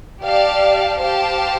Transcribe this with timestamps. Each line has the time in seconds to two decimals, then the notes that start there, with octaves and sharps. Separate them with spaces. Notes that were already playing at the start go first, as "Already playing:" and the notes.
0.22 G4 D5 F5 A5
0.99 G4 C5 F5 A5